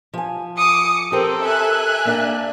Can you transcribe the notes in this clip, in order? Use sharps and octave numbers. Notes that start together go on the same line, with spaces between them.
F3 G#5
D6 D#6 C#7
C4 G4 A4 A#4
E5 G#5 F#6
A#3 D4 D5